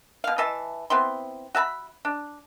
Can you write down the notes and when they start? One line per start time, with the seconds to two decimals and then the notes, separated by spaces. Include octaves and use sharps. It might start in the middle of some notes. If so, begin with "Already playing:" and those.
0.24 B2 F5
0.38 E3 D#5 E5 A5
0.90 B3 C4 E4 C6
1.55 F#4 E5 A5 B5
2.05 D4